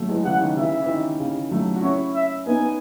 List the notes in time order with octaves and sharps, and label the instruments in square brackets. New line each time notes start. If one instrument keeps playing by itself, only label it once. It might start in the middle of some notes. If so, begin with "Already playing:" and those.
Already playing: [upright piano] F#3 A3
E3 G#3
[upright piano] C#3 E3 [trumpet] F#5
[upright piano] D#3
[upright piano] C#3 E3 [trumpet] E5
[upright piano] E3
D#3
C#3
F#3 A3
F#4
[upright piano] C#4 E4 [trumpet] C#5
[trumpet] E5
[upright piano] B3 D#4 [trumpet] G#5